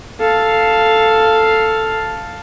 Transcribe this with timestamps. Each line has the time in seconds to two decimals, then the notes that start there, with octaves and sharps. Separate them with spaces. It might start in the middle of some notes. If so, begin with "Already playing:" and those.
0.20 A4 F5